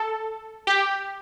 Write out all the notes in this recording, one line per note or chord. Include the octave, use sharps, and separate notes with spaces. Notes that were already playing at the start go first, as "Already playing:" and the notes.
Already playing: A4
G4